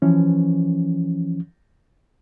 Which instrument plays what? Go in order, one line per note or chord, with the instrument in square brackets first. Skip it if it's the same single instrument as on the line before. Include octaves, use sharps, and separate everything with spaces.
[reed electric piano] E3 F3 C#4